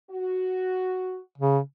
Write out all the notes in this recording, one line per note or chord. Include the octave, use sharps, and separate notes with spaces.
F#4
C#3